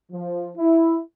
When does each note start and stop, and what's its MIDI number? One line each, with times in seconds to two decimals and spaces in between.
0.12 0.50 53
0.57 1.00 64